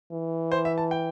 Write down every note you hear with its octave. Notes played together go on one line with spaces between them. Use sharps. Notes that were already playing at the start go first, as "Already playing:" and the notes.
E3
C5
E5
A5
G5